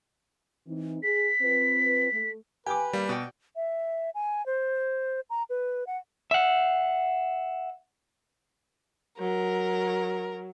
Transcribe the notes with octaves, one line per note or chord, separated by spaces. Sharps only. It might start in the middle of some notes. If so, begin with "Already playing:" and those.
E3 C4 D#4
G#4 B6
C4 F4 B4
A3
G4 B4 G5 G#5 D6
G3 A#3
B2 F#4 D5 G5
E5
G#5
C5
A#5
B4
F#5
E5 F#5
F#3 A#4